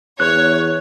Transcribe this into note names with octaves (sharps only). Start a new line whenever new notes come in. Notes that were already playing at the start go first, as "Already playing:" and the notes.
E2 C#5 F#6